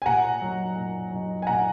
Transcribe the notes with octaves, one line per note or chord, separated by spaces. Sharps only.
G#5
A#2 F#5 A#5
F#3 D#4
A#2
F#3 D#4
G#5
A#2 F#5 A#5